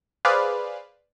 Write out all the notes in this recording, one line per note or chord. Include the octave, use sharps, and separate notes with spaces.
G#4 B4 C5 D5 F5